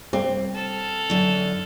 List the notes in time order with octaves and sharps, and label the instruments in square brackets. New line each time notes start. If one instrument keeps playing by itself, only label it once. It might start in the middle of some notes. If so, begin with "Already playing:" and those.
[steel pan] G3 [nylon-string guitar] C4
[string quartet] A4 F6
[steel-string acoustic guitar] F#2 D3